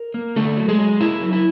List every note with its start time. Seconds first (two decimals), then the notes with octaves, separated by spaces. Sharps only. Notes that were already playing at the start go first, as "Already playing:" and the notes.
Already playing: A#4
0.14 A#3
0.36 D3 A3 A4
0.57 F#3
0.68 G#3 G#4
0.78 F#3
1.00 A#3 E4
1.22 F#3
1.33 E4